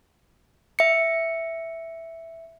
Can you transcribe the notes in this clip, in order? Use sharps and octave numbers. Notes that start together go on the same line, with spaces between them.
E5 C#7